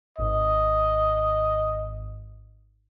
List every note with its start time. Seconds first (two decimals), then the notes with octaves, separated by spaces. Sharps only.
0.19 G#1 G#2 D#5